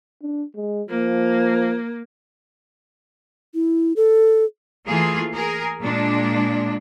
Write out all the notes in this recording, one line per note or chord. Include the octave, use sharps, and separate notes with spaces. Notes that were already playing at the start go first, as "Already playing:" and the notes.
D4
G#3
F3 A#3
E4
A4
E3 A3 A#3 F4 G#4
G#4 A#4
A#2 G#3 D4